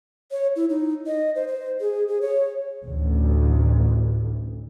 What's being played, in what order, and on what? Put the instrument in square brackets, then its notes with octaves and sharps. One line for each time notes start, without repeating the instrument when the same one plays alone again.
[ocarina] C#5
E4
D#4
D#5
C5
C5
G#4
G#4
C#5
[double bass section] A1 D2